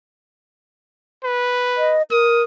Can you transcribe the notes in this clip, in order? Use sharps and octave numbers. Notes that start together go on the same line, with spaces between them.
B4
D#5
A#4 D#6